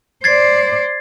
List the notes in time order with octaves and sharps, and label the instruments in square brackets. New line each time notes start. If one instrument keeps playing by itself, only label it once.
[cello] C5 D5 [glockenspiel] G#6 A6 C7